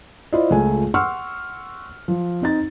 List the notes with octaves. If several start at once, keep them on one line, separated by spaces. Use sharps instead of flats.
E4 F4 C5 D5 D#5
C#2 A3 F4 G#5
F#5 C6 C#6 E6 F6
F3
C4 D#4 A6